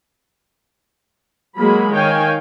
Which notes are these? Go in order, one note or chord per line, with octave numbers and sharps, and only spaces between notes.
F#3 G#3 A#3 F#4 G#4 B5
D#3 C#5 F5 G5 G#5